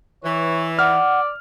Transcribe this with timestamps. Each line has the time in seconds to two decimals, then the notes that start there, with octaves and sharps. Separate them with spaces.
0.24 E3 C#5
0.79 D5 F#5 F6